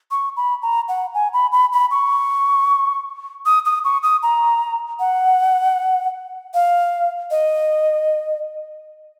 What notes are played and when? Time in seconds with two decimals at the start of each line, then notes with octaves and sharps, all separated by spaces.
0.11 C#6
0.37 B5
0.63 A#5
0.88 F#5
1.15 G#5
1.33 B5
1.52 B5
1.73 B5
1.91 C#6
3.46 D#6
3.65 D#6
3.84 C#6
4.03 D#6
4.23 A#5
5.00 F#5
6.54 F5
7.31 D#5